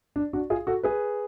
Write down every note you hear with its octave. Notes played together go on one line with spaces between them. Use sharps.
D4
D4 F#4
F4 G#4
F#4 A4
G#4 B4